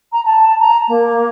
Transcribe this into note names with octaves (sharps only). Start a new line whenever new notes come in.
A#5
A5
A#5
A#3